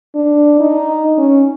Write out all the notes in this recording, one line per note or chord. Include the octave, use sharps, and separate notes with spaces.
D4
D#4
C#4